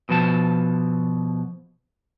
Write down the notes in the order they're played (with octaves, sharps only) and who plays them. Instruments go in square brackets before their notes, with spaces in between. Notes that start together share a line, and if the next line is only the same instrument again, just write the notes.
[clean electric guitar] B2 F3 A5